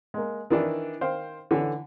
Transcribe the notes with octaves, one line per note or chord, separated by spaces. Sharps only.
G#3 A#3
D#3 E3 D4 E4
D#3 C5 F5 G5
D3 E3 C#4